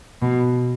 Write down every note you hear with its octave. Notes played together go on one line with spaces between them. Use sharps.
B2